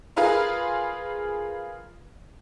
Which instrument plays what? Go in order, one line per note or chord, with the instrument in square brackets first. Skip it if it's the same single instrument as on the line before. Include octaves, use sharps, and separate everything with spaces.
[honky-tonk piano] F4 G#4 A#4 B4 F5 C6